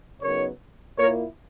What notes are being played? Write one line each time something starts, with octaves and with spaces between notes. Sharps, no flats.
C#3 F#3 B3 D#4 A#4 C#5
A#2 A#3 E4 A#4 C#5